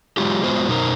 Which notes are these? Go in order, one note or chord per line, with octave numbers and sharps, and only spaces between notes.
F#3 G#3 F4 G4
G#3 B3 F4 F#4 C5
F#2 B2 D#4 A#4 C5